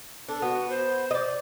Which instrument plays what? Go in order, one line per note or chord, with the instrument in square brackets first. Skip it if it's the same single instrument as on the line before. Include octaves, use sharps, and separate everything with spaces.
[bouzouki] D4 [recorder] A4
[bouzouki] B3 [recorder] F#4
[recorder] C5
[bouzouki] D5 D#5